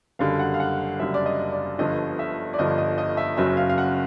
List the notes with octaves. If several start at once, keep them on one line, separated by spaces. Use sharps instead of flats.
F#1 F#2 D3 G3 F5
F#5
F5
F#5
F#1 F#2 D3 G3 E5
D5
D#5
D5
G1 G2 D3 F3 D#5
E5
D5
G1 G2 D3 F3 D#5
D#5
D#5
E5
F#1 F#2 C#3 F#3 E5
F5
F5
F#5